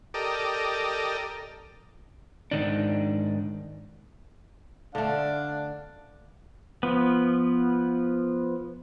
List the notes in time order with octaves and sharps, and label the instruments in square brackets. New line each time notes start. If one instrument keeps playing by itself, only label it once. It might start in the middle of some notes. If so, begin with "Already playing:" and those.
[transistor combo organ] G4 A4 A#4 D5 D#5
[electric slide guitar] G#2 D#3 D4
[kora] D3 A3 [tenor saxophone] D4 [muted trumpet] F5
[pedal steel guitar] F3 B3